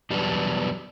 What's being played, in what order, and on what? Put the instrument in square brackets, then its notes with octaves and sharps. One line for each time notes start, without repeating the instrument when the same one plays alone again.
[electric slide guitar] E2 B2 F#3 G3 B3 D4